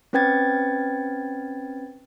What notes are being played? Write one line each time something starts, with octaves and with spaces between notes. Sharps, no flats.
C4 C#4 B4 G5 G#6 A6